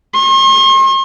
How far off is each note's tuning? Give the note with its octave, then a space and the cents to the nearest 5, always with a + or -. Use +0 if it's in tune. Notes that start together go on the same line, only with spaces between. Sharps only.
C6 +45